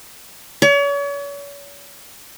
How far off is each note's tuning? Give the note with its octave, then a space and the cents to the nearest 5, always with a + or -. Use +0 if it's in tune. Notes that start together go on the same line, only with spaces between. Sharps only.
C#5 +40